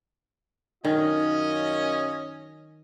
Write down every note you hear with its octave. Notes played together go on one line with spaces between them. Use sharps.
F#2 D#3 C#4 F4 D#5